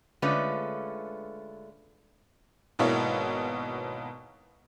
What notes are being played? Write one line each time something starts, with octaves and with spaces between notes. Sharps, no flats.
D3 G#3 A3 C#4 F4 B4
G#1 B2 A#3 E4 C#5